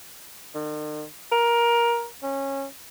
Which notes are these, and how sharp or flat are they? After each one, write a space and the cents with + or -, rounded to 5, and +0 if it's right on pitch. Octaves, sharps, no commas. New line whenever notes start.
D#3 -45
A#4 +15
C#4 -20